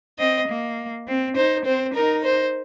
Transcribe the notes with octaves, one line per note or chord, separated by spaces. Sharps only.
C4 D#5
A#3
C4
D#4 C5
C4 C5
D#4 A#4
C5